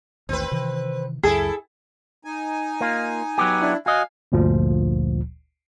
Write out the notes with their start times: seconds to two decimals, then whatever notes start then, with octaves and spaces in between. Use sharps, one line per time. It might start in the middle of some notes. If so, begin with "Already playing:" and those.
0.29 A1 D#2 A2 C4 B4
0.51 C3 D#3 E3
1.23 C#2 F#2 C#3 E4 G#4 A4
2.25 D#4 G#5
2.81 A#3 F4
3.38 F#3 B3 G4
3.61 D4 E4
3.86 F#3 F#4 D#5 F5 G#5
4.32 G1 D2 A#2 F3